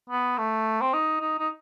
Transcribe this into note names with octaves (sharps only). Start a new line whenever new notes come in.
B3
A3
C4
D#4
D#4
D#4